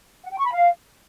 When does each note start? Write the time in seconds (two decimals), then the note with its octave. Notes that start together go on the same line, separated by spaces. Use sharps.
0.23 F#5
0.31 G5
0.38 C#6
0.45 B5
0.53 F5